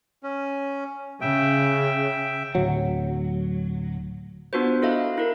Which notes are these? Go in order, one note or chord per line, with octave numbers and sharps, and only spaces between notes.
C#4
C#3 E5 G5
D1 F#3
B3 D4 F4 F#4 B4 C5
E4 A4 D#5 F5
E4 A#4